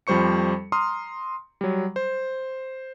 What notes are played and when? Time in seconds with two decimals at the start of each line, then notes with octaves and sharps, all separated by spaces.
0.07 F2 F3 G3 C5 C#6 C#7
0.72 A#5 C6 D#6 F6
1.61 F#3 G3
1.96 C5